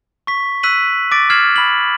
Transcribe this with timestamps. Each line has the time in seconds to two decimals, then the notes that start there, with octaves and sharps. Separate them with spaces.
0.27 C#6 B6
0.63 E6 F#6 B6 D#7 F#7
1.12 D6 A6 B6 D7
1.30 F6 G#6 C7 E7 F#7
1.56 B5 B6 F#7